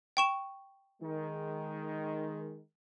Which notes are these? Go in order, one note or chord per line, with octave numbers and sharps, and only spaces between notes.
G5 C#6 E7
D#3 G#3